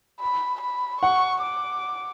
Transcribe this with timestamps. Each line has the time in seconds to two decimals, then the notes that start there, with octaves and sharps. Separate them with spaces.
0.21 B5
0.61 B5
1.02 F#5 C#6
1.42 D6